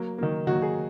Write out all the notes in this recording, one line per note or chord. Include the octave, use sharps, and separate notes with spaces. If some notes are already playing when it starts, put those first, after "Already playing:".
Already playing: F#3 A#3
D#3 F#3 A#3
D#3 F#3 A#3 F#4
G#4